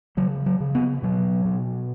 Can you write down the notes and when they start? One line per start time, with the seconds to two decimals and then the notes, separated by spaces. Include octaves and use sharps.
0.17 C#3 F#3
0.46 F#3
0.60 C#3
0.75 B3
1.02 B2 F#3
1.45 B2